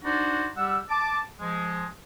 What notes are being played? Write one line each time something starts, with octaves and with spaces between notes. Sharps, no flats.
D4 D#4 F#4 C5 D5
G3 G4 F#5 E6
A5 D6
F3 G#3